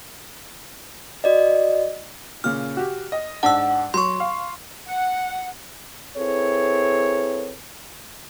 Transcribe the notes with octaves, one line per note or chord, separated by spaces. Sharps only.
F#4 D5 D#5
A#2 C#3 F6
F#4 G4
D#5
G#2 D4 F#5 A5 E6
F#3 C6 C#6
F5
F#5
C4 E4 G#4 A4 B4 C#5